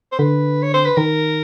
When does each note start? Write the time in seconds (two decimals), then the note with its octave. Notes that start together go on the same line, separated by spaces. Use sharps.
0.12 C5
0.19 D3 B4
0.63 C#5
0.74 C5
0.86 B4
0.97 D#3 A#4